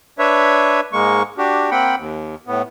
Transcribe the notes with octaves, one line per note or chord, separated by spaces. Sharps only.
D4 B4 C#5 E5
G#2 G#3 A#3 C#6
D4 F#4 G4
A#3 C4 F#5 G5 B5
D#2
A2 B3